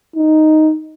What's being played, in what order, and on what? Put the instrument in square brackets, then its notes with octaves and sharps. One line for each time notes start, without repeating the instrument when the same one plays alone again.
[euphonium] D#4